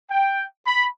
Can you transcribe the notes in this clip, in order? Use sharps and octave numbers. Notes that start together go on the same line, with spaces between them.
G5
B5